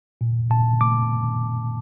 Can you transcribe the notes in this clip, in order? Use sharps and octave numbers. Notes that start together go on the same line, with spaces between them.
A#2
A#2 A5
A3 D6